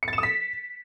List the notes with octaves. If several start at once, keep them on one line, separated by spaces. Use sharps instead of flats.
C#7
A6
E7
D#6
B6